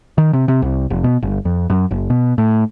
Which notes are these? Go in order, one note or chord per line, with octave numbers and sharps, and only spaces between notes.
D#3
C3
C3
C2
F1
B2
G1
F2
F#2
F#1
B2
A2